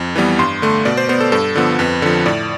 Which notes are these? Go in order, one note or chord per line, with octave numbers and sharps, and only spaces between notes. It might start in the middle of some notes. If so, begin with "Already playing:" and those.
Already playing: F2
E3 G3 B3
G2 C6
D3 A3
B2 D5
C5
B3 C5
A4
G2 A4
D3 F3 B3
F2 B4
D3 F3
A2 D5